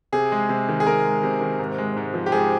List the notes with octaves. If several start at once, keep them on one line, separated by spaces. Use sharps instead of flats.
C3 G#4
G#3
C3
D#3
G#4
C3 A#4
G#3
C3
D#3
G#2
G#3
G#2
F3
G4
G#2 G#4